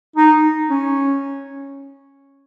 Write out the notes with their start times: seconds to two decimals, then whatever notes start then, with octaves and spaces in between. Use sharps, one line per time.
0.16 D#4
0.70 C#4